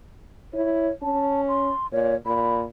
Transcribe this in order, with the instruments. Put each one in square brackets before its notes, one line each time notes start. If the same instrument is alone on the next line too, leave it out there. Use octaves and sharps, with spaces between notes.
[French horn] E4 [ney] C#5
[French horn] C#4 [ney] A5
[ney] C6
[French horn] A#2 [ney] C#5
[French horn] A#2 [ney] B5